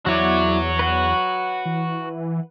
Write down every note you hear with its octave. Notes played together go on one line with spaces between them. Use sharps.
E2 F#3 E4 F#4 C#5 D5
B4 F#5
E3